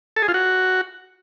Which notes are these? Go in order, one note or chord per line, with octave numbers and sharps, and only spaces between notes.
A4
G#4
F4
F#4